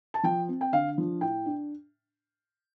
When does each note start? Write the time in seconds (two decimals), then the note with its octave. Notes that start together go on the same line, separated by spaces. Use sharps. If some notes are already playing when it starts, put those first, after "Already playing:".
0.14 A5
0.23 F3 G5
0.48 C4
0.61 G5
0.72 D3 F5
0.98 F3 D4
1.21 A2 G5
1.46 D4